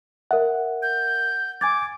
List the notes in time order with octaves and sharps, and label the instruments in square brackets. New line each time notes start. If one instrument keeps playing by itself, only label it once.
[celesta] A#4 E5 [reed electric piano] F#5
[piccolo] G6
[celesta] G#5 G#6 A6 [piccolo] D6